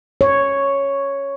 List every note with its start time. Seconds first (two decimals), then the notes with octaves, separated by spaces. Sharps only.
0.21 C#5